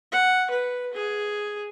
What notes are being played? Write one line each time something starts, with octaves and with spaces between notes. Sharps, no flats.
F#5
B4
G#4